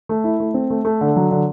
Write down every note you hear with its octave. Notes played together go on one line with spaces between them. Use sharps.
A3
E4
A3
C4
A3
A3
D3
F#3
D3